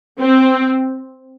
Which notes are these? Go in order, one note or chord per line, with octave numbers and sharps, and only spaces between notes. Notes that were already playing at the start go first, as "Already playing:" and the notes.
C4